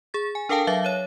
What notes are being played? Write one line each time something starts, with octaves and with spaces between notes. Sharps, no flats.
G#4 A6
G#5
D4 A4 A#4 F5 G5 A5
F#3 E5 F5 A6
C#5 D#7